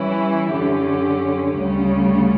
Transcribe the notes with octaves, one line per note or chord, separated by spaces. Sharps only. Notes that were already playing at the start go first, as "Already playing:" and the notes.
Already playing: E3 G3 C#4 E4
F#2 D3 F#3 C#4 G4
D2 C#3 G3 C#4